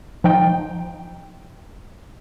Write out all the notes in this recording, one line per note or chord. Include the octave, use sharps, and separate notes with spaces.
F3 D#4 G5